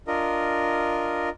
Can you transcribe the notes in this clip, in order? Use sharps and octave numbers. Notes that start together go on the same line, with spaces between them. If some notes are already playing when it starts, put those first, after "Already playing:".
D4 F4 A#4 D#5